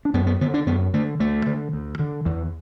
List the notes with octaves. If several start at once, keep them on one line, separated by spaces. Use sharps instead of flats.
D4
F#2 B3
B3
D3 B3
D4
F#2 B3
D3 A3
D2 A3
D3
D2
D3
E2 E3